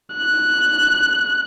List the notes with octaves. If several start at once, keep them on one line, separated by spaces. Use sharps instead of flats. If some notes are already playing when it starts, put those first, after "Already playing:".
F#6